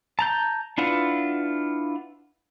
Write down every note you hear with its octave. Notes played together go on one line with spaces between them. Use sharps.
A5 A#5 G6
D4 E4 F4 B4 F#5